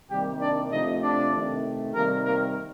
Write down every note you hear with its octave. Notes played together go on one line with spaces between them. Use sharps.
C3 D#3 G3 A#3 G4
D4 D5
C3 F3 A3 D#4 D#5
D4 D5
C3 D#3 A3
C3 D#3 G3 A#3 A#4
A#3 A#4